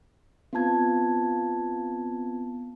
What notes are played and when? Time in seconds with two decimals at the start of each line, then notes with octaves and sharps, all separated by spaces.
0.53 B3 C4 F4 A5 G#6